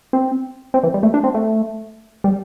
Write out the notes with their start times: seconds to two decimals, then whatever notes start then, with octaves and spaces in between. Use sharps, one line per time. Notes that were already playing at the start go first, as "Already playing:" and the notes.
0.13 C4
0.74 C4
0.83 E3
0.94 G3
1.03 A3
1.14 D4
1.24 C4
1.34 A3
2.24 G3